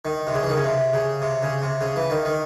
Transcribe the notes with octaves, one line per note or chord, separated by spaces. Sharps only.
D#3
C3
C#3
E3
D#3
C#3
C3
C#3
C3
C#3
C3
C#3
E3
D#3
D#3